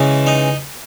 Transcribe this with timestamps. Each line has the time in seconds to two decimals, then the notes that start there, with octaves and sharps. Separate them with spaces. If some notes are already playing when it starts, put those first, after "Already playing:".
Already playing: C#3 E3 G#3
0.27 D#4